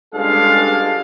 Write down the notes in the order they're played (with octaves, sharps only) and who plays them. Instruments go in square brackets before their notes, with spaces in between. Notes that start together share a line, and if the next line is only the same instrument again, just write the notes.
[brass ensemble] C#2 G2 G#3 D4 A4 F5